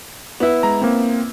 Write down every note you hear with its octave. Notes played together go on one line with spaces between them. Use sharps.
B3 E4
G#3 A#5
A#3 C4